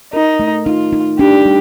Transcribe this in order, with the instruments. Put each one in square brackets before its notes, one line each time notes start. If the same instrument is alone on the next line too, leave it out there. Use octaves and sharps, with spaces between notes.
[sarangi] D#4 [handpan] A#4
[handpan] A3
[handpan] D#4 [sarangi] F4
[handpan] D#4
[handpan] D4 [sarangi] G4
[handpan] G3